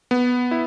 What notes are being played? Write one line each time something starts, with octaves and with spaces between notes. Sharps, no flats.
B3
E4